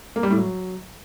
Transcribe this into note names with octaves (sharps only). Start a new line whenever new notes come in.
A#3
G3
A2
F#3